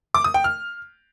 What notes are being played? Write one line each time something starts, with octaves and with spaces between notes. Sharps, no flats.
D6
D#6
G5
F6